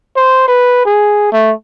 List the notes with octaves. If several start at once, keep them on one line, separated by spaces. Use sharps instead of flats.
C5
B4
G#4
A3